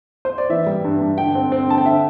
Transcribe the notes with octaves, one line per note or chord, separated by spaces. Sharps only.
C5
D5
E3 E5
G3
G2
G2
D3 G5
C4
C4
D3 A5
G5
D3 E5